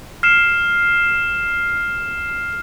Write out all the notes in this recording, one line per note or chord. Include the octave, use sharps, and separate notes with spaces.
F6 C7 E7